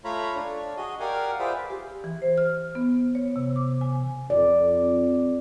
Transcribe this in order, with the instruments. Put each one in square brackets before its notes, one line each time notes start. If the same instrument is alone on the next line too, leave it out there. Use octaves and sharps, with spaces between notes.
[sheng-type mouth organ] A3 F4 C#5 A#5 B5
D4 C#5
F#4 G#4 D#5
G4 A#4 D5 F5 F#5 G#5
F4 G#4 B4 C5 D5 E5
[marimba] G4
E3
C5
F6
B3
C#5
C3
D6
G#5
[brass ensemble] F2 [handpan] D5